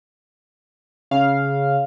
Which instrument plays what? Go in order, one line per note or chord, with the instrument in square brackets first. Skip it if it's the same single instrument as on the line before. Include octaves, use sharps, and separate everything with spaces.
[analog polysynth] C#3 F5